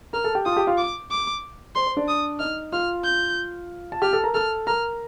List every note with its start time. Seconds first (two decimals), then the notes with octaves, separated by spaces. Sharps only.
0.13 A#4 A#5 F6
0.24 A4 A5
0.35 G4 G5
0.46 F4 F5 D#6
0.53 A5
0.56 G4 G5
0.67 F4 F5
0.78 D6
1.11 D6
1.76 C5 C6
1.86 C5
1.97 D4 D5
2.08 D#6
2.40 D#4 D#5 F6
2.72 F4 F5 F6
3.05 G6
3.92 A5
4.02 G4 G5 F6
4.13 A4 A5
4.24 A#4 A#5
4.34 A4 A5 F6
4.67 A#4 A#5 F6